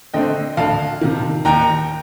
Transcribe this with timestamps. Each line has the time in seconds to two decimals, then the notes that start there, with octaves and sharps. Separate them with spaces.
0.14 D3 A3 C4 D#5 G5
0.57 D2 F5 A5
1.01 C3 D#3
1.45 D#2 G5 A#5